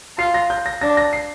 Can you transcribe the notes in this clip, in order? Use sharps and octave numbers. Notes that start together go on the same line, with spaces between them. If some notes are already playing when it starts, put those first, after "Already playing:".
F4 C7
A#6
G6
A#6
D4 A#6
A#6
C7